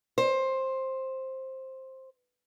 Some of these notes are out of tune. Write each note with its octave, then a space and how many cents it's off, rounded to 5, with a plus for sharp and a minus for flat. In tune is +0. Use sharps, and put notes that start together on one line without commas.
C5 +10